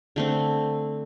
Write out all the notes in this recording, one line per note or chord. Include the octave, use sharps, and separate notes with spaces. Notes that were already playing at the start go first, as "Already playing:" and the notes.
D3 A3 C4